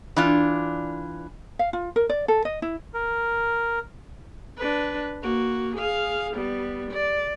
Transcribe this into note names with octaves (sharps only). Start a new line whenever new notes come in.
E3 D4 F4
F5
F4
A#4
D5
A4
D#5
E4
A#4
D4 B4
A#3 F#4
G#4 F5
G3 B3
D5